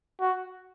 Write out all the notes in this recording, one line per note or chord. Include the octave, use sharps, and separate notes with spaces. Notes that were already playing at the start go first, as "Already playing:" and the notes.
F#4